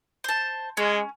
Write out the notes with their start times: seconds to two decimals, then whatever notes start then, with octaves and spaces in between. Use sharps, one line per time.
0.24 C5 A5
0.77 G#3 C#4